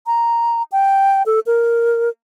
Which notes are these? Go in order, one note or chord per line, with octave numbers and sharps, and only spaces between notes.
A#5
G5
A4
A#4